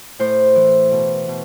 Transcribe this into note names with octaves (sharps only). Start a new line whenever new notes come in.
A2 C5
E3
B2
B2